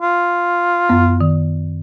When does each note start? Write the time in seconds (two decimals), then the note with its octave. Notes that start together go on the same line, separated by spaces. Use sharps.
0.02 F4
0.89 F#2 B3
1.21 D#3